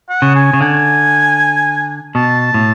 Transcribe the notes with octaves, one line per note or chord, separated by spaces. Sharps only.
F#5
C#3
G#5
C#3
D3 G#5
B2 A5
A2